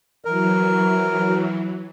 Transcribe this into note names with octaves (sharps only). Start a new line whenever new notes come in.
E3 F#3 A#4